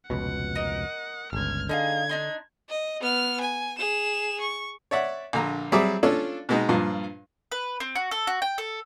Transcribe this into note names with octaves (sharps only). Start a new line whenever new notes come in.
F1 C#2 B2 F#5
A#4 D#5
G1 C#2 F6 G#6
D3 D#4 G#4 F5 G#6
D4 D#4 C6
D#5
B3 F6
G#5
G#4 E7
C#6
C#5 D5 E5 F#5
A#1 D3 A#5
F#3 G3 C4 G#4 E5 D6
C#4 D4 F4 A4
B2 G#3 D#4
G2 A#2 F3
B4
C4
F#4
A4
F#4
G5
A4